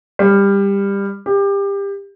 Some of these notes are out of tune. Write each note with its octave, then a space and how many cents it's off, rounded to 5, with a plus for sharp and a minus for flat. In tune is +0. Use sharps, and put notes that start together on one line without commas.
G3 +20
G4 +25